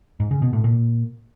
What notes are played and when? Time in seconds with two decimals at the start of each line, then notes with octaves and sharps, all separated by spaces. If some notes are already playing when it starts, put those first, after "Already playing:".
0.20 G#2
0.31 C#3
0.42 B2
0.53 A2
0.64 A#2